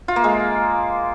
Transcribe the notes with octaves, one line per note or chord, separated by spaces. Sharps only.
F4
A#3
G#3